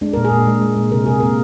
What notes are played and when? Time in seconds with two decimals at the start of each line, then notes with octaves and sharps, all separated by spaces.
0.01 G#3 D4
0.13 A#2 A#4
0.25 G#4
0.32 A#2
0.47 G#3
0.61 G#3
0.77 A#2
0.92 C3 A#4
1.06 C3 G#4
1.20 A#3 A#4